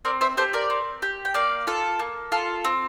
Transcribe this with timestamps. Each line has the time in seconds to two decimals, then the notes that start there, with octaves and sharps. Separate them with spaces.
0.05 C4 A#4 D5
0.21 C5 E5
0.37 G4 A4 C5
0.53 A#4 D5
0.70 C4
1.02 G4
1.25 G5
1.34 A#3 D5 F5
1.67 F4 A4
1.99 A#3
2.32 F4 A4
2.65 C4